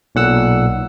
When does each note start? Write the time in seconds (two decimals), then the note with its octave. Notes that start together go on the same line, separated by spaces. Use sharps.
0.15 B1 A#2 F#5 E6